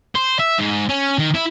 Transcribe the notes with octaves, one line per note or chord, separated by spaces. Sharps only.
C5
E5
G#2
C#4
D#3
E4